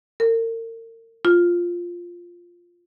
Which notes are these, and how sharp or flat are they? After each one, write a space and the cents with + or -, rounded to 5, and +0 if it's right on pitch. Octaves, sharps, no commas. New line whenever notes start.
A#4 -40
F4 +0